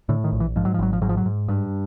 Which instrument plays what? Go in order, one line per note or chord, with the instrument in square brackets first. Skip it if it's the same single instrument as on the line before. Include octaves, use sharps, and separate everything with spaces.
[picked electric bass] A2 D3
D#3
A#1
E3
G#2 F3
F#3
F3
G#1 F#3
F3
G#2 F#3
F3
F#3
G#2
G2